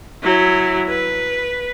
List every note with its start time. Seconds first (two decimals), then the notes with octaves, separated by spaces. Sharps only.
0.22 F#3 E4
0.88 B4